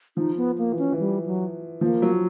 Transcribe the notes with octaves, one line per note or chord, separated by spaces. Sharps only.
F3 D#4
B3
A#3
E3
C#4
E3
G3
F#3
F3 A#3
F#3